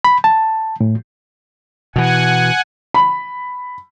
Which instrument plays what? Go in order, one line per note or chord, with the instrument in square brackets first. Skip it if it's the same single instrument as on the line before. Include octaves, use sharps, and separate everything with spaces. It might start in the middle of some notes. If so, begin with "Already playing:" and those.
[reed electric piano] B5
A5
A2
[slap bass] B2 E3 [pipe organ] F#5 G#5
[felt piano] B5